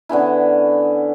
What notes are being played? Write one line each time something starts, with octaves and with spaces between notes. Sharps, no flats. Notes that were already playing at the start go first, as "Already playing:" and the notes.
D3 B3 C#4 E4